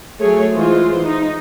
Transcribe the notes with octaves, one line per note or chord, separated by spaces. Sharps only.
F#3 A3 G#4 C#5
E3 G#3 F4 C5
D#4